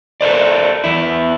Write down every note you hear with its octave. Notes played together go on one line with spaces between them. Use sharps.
A4 A#4 C5 D5
E2 E4